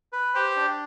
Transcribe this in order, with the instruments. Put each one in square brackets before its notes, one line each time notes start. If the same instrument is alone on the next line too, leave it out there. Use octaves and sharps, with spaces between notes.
[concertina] B4
[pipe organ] G4 [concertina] C5
[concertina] D4